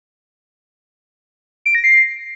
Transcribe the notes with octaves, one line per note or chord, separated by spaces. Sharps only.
D7
A#6
C7